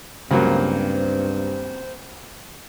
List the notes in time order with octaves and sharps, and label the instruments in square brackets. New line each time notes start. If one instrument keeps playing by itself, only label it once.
[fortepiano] C#2 F#3 A#3 [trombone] G2 [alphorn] C4 [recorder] C5